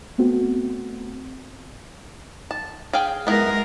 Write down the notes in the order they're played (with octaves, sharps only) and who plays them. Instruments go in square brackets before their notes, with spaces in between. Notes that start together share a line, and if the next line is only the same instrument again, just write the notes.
[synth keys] A3 B3 C4 F#4
[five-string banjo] A5
G#4 F5 G5
[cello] G#3 A#4 [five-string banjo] B3 E4